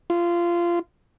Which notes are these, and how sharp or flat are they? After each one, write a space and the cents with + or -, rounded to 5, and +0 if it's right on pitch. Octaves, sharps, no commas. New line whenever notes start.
F4 -20